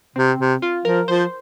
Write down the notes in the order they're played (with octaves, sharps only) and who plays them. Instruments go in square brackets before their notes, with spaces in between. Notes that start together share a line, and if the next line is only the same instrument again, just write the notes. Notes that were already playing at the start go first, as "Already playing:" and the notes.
[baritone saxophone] C3 [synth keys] C4
[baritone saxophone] C3
[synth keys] F4
[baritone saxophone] F3 [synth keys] A#4
[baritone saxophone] F3 [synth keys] C5